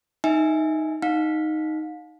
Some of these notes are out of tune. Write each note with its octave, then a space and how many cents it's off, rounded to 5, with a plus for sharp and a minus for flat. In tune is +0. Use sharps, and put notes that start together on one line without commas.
D#4 +0 E5 -15 G#5 +0
D#4 +0 F5 +35